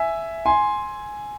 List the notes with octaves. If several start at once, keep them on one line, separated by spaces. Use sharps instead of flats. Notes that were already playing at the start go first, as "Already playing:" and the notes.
Already playing: E5 G#5
G#5 C6